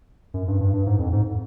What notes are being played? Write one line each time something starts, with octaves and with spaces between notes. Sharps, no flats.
F#2
G2
G2
G2
G#2
F2
G#2